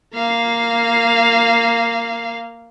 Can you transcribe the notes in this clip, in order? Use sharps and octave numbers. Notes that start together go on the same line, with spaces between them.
A#3 F5